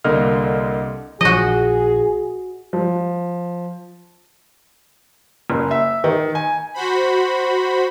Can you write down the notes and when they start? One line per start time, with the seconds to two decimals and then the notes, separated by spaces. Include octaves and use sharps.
0.04 C2 D3 A#3 D#5 F6
1.21 A#1 F3 F#4 G#4 D#5
2.73 F3
5.50 F#1
5.71 E5
6.04 D#3
6.35 G#5
6.74 F#4 C5 B5